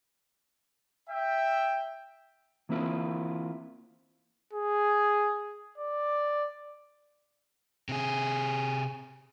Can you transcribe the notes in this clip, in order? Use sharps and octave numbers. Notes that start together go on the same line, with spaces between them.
E5 G5
E3 A#3 C4 E4 F4
G#4
D5
C3 G#4